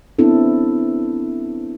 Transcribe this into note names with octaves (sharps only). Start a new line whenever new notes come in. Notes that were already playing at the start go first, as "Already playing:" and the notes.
B3 C4 D4 E4 A4